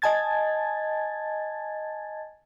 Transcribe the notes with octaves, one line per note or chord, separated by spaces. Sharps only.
D#5 G#5 A5 G#6 A6